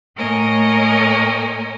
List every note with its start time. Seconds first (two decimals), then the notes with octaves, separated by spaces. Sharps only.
0.18 A2 A#3 A#4 C#5 D#5 G#5